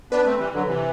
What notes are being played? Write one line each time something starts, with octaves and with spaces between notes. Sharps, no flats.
B3 D4 B4
A3 C4
E3 G3
D3 F#3
C3 E3